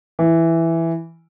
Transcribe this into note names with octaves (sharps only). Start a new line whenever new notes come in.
E3